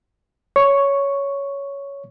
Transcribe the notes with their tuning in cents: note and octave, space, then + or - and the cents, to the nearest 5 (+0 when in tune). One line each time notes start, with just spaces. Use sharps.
C#5 +10 C#6 +0